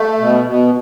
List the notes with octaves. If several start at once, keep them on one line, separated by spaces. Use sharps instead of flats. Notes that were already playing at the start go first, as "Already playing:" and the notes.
Already playing: A3
B2
B2